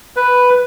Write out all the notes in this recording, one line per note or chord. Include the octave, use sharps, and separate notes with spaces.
B4